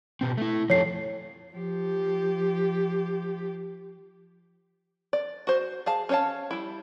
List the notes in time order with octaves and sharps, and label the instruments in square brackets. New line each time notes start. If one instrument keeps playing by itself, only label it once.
[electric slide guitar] B2 C4
A3 E4
[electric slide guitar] F3 A3 A4 [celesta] C#5 C7
[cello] F3 G4
[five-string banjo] D5
F#4 C5
G#4 F5 A5
C#4 C5 C#5 F5 A5
G3 E4